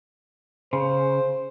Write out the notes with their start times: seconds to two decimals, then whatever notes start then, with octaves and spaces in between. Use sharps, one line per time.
0.73 C#3 C5